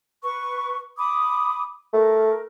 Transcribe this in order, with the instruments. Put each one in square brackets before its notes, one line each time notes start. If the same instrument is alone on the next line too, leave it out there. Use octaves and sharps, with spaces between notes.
[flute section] B4 C#6
B5 D6 D#6
[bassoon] A3 [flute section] A#4